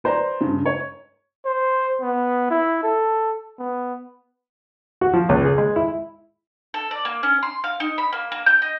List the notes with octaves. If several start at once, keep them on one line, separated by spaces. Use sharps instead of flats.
B4 C5 D5 A#5
G2 C#3
C#5
C5
B3
E4
A4
B3
F#4
F3
C#2
G#4
G#3
E4
A4
D5
A#3
C#4
C6
F5
D#4
B5
A#3
A#3
G6
D#5